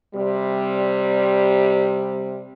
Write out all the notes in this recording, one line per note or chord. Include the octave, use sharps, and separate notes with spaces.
C3 G3